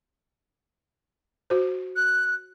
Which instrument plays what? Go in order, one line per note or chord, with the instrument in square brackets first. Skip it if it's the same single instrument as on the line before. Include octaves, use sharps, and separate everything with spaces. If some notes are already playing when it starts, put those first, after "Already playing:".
[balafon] F#4 C5
[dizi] F#6